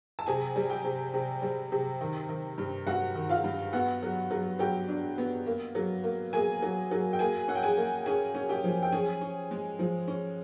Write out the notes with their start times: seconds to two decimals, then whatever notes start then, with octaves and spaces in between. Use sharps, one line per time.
0.19 A5
0.26 C3 G#4 G#5
0.56 G3
0.70 G4 G5
0.84 C3
1.14 C3
1.42 G3
1.72 C3
2.01 D#3
2.29 D#3
2.58 G2
2.87 G2 F#4 F#5
3.15 D#3
3.29 F4 F5
3.44 G2
3.73 B3 F#4 F#5
4.03 F#3
4.31 F#3
4.59 F#3 G4 G5
4.88 D4
5.18 B3
5.46 A#3
5.75 F#3
6.04 A#3
6.33 A#3 G#4 G#5
6.62 F#3
6.91 F#3
7.13 G5
7.19 A#3 G#4 G#5
7.48 C#4 F#5
7.55 G5
7.63 G#4 G#5
7.77 A#3
8.06 C#4 G#4 G#5
8.35 C#4
8.49 G4 G5
8.64 F3
8.83 G5
8.92 C#4 G#4 G#5
9.21 C#4
9.51 G#3
9.79 F3
10.08 C#4